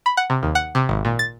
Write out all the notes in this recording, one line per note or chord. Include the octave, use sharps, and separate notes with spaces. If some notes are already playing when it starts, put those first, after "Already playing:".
B5
F#5
C3
D#2
F#5
C3
G#1
A#2
A6